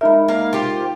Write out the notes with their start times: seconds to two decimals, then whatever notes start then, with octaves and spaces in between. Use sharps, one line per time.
0.01 G#3 D#4 A#4 E5 B5
0.28 A#3 F5
0.53 F4 G4 C5